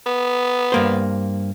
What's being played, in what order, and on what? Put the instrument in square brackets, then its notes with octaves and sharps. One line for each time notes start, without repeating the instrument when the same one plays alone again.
[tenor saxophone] B3
[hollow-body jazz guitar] G2 A#3 C5